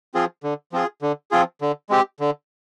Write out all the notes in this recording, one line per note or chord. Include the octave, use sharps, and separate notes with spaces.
F3 C4 F4 G#4
D3
F3 C4 F4 G#4
D3
F3 C4 F4 G#4
D3
G#3 C4 G4
D3